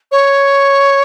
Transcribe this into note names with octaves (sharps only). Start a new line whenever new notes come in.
C#5